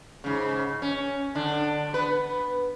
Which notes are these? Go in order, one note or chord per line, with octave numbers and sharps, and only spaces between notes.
G#2 C#3
C#4
D3 D4
B3 B4